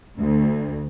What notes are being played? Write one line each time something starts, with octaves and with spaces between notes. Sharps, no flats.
D2